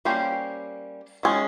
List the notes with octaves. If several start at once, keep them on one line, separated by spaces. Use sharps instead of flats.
G3 A#3 C#4 G4 C5
D#3 G#3 C#4